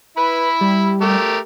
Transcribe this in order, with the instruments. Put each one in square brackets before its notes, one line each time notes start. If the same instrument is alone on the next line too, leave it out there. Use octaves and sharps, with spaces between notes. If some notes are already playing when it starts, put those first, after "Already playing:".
[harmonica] E4 B5 [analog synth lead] B4
[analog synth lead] G3
[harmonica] A3 G4 A#4